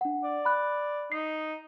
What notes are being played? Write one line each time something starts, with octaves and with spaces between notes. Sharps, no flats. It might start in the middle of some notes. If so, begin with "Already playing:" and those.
D4 F#5
D5
B5 F#6
D#4 C7